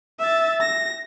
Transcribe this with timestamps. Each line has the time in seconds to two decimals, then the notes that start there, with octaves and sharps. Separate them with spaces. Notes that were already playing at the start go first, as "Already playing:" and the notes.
0.20 E5 A6
0.61 A#6